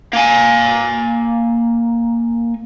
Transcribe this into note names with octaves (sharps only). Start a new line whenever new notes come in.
A#3 G#5